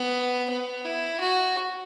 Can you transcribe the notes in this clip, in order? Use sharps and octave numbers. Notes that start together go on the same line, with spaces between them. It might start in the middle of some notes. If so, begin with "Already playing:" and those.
Already playing: B3
B3
E4
F#4